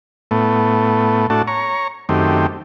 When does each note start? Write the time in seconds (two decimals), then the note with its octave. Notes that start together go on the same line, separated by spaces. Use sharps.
0.31 A2 A3 B3
1.30 A2 A3 D4 F#4 A5
1.48 C#5 A#5 C#6
2.09 F#2 D#3 A3 C4 G4